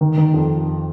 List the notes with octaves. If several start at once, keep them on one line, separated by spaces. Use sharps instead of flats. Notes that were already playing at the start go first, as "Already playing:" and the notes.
D#3
D#3
F2